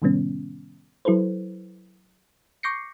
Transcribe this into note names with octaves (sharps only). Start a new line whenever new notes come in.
A2 C3 D#3 G3 B3 C#4
F#3 E4 A4 B4 C5
C#6 D6 G6 A#6 C7 C#7